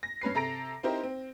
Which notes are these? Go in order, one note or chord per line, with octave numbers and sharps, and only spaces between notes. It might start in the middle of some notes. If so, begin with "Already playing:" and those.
A#6
G2 C#4 B4 C7
C3 A4 A#5 A#6 D7
C4 D#4 E4 G4 A#4 C5
C4